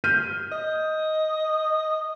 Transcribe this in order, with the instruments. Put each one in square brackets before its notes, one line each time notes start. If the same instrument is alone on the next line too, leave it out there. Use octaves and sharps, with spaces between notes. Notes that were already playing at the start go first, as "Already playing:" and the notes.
[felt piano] F6 G6 D#7
[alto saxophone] D#5